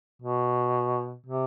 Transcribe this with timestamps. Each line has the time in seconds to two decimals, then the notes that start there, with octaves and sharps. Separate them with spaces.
0.22 B2
1.26 C3